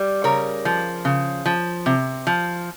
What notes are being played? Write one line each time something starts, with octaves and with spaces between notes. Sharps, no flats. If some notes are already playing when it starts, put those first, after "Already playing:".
Already playing: G3
C#3 A#4 C#5
F3
C#3
F3
C3
F3